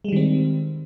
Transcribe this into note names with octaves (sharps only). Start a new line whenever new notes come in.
D#3 G3 G#3 C4